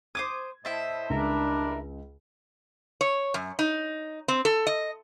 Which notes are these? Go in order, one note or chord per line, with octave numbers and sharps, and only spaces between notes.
C5 D6 D#6 G#6
A2 E4 C5 D#5 E5 A5
C#2 G3 D4 A#4 B5
C#5
F#2
D#4
C4
A4
D#5